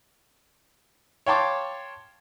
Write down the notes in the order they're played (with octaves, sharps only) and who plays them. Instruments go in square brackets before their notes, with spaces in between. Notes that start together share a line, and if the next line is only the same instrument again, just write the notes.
[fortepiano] C#5 F5 G5 A5 C6 D6